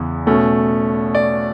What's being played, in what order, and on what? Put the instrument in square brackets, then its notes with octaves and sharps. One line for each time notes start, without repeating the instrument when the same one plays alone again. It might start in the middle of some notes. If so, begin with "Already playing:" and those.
Already playing: [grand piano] E2 C#3 B3
B2 A3 C#4
D5